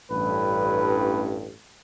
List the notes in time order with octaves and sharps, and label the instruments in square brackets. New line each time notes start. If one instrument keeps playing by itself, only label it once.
[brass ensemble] A1 G2 [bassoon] B4